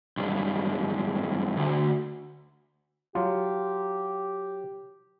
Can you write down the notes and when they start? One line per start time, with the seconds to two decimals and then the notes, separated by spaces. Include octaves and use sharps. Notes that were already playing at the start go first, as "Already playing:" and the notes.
0.17 B1 G2
1.56 D2
3.15 F#3 F4 G4